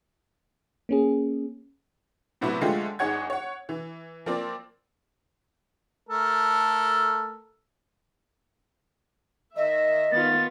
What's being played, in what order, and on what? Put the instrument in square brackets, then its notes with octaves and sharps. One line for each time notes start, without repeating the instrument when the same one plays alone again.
[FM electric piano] A#3 C#4 G#4
[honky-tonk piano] A2 C3 F#3 B3 E4 F#4
D3 F3 G#3 A3 F4 G4
G1 D#4 G#4 C#5 F#5 G#6
C#5 F#5
E3
F3 A#3 C4 D5
[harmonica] A3 A4 A#4
[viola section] D#3 E5 [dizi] D#5
[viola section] D#3 B3 F4 [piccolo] A6